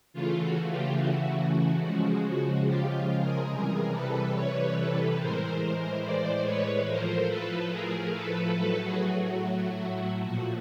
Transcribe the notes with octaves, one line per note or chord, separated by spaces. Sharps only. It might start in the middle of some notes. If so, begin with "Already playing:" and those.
C#3 E3 A3 F4
F#4
F4 G4
F#4
C#3 F3 G#3 F#4
F#4
F4 G4
F4
G#4 A#4
C3 E3 G3 G#4 A#4
A4 B4
B4 C#5
A4 B4
A2 E3 G#3 A#4 C5
A#4 C5
C5 D5
B4 C#5
A2 F3 A3 A#4 C5
A4 B4
G#4 A#4
A4 B4
A2 F#3 A3 A4 B4
F#4 G#4
F#4
A#2 F3 A3 F#4